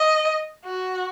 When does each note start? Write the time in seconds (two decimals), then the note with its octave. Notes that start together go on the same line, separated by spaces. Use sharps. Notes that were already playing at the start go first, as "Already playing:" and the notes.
Already playing: D#5
0.65 F#4